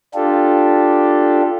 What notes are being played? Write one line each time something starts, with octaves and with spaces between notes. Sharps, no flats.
D4 F4 G4 A4